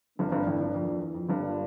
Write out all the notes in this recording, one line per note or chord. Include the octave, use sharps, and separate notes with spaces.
G1 G2 E3 A#3 D4
G1 G2
A1 A2
G1 G2
F2
F2
E2
F2
G1 G2 D3 G3 A#3 D4 F4